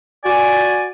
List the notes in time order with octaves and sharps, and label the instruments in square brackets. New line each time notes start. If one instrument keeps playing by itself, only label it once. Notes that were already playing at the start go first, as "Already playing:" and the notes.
[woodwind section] F#4 D5 G#5